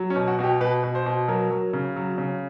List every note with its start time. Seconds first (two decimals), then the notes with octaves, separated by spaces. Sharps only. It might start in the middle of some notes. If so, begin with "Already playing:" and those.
Already playing: F#3
0.10 C#4
0.16 B2
0.28 F#4
0.39 B2 F#4
0.43 G4
0.60 B2 B4
0.83 B2
0.95 C5
1.06 B2
1.28 F#3 A#4
1.51 F#3
1.73 C#3
1.96 F#3
2.18 C#3